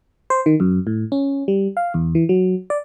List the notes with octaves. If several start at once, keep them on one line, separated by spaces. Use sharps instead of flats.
C5
D#3
F#2
A2
C#4
G3
F5
E2
E3
F#3
D5